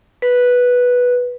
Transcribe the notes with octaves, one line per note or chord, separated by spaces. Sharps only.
B4